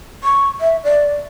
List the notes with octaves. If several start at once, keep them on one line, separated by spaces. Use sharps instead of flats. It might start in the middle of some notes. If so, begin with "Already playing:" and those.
C#6
E5
D5